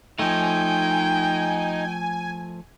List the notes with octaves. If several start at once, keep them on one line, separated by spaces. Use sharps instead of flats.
F3 A3 D#4 G5 G#5